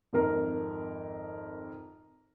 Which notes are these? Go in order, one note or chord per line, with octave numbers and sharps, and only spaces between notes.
G#1 F2 A#4 A#5